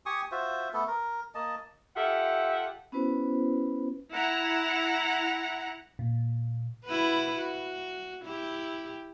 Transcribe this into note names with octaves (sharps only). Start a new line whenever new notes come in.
G4 G#5 C#6 D#6
F4 F#4 C5 E5
A3 B3 A4
A#4
A#3 D#5 A5
F4 G4 A4 E5 F#5
B3 C#4 E4 F#4 B4 C5
E4 F#5 A#5
A#2
E4 F#4 B4
F#4
E4 G4